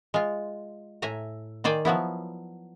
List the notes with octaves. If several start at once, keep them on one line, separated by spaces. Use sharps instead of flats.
G#3 F4
A2 E5 G#5 A#5
D#3 C5 D5 G5 G#5
F3 F#3 B3 E4